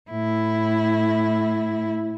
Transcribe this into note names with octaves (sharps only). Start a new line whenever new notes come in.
A2 E4